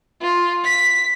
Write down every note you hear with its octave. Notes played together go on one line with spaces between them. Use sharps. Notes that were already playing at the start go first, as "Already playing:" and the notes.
F4
B6